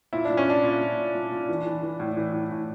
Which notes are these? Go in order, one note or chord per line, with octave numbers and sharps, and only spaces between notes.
A#2 E4
D4
A#2
C#4
A#2 D4
A#2
A#2
A#2
A#2
A#2
E3
E3
E3
A2
E3
A2
A2